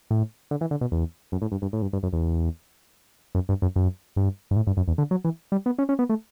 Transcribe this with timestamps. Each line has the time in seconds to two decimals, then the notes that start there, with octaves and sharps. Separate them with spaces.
0.11 A2
0.51 D3
0.61 E3
0.71 D3
0.81 B2
0.92 E2
1.32 F#2
1.42 A2
1.52 G2
1.62 G2
1.73 A2
1.82 G2
1.93 G2
2.03 F#2
2.13 E2
3.35 F#2
3.49 G2
3.62 F#2
3.76 F#2
4.16 G2
4.51 G2
4.56 A2
4.67 G2
4.77 F#2
4.88 E2
4.98 D3
5.11 F#3
5.25 E3
5.52 G3
5.66 B3
5.78 C#4
5.89 C#4
5.99 B3
6.09 A3